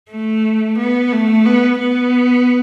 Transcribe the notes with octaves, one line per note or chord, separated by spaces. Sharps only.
A3
B3
A3
B3
B3